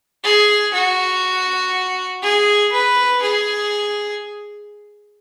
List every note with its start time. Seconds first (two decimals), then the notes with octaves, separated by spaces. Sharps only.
0.24 G#4
0.73 F#4
2.22 G#4
2.72 B4
3.23 G#4